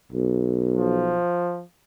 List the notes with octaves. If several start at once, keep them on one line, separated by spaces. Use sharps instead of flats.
B1
F3